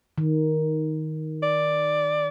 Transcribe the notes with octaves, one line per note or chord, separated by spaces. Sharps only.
D#3
D5